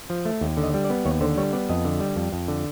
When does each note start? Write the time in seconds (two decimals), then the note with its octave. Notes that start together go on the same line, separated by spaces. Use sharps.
0.10 F3
0.25 A3
0.41 D#2
0.57 D3
0.63 D#5
0.74 G3
0.85 D5
0.90 B3
1.05 D#2 C#5
1.21 D3 C5
1.37 G3 C#5
1.53 B3 D5
1.69 F2 D#5
1.85 D3
2.00 G3
2.16 F2
2.33 F2
2.48 D3